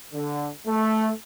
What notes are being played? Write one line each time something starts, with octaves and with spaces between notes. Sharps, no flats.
D3
A3